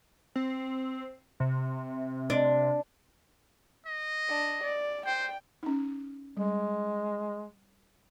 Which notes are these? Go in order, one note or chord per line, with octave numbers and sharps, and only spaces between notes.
C4
C3
D4
D#5
D4
D5
C5 G5
C#4 D#4
G3 G#3